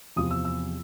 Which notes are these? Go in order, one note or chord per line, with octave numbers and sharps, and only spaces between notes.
E2 C3 F3 D#6
E6
E6